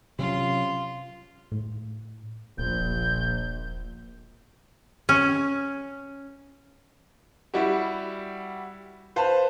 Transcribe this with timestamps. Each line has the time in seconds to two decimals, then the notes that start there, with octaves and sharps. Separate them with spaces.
0.19 C3 F#3 C#4 F4
1.52 A2
2.58 D#1 A#1 G6
5.09 C#4
7.54 G3 E4 F#4 G4
9.16 B4 C5 F5 A5